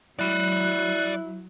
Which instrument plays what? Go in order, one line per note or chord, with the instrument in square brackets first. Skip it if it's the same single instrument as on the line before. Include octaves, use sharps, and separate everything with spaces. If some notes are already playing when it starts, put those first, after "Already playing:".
[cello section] F#3 [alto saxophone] E4 [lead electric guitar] D5 B5 [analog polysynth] F#6